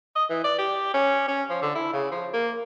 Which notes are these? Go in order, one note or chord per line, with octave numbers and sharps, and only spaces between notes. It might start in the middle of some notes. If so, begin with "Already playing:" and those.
D#5
E3
D5
G4
C#4
C#4
F3
D3
E4
C#3
F3
A#3